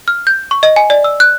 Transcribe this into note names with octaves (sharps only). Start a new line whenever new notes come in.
F6
G6
C#6
D#5
G#5
D5
E6
F#6